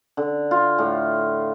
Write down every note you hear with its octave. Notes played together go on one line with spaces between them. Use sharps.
D3
F4
A2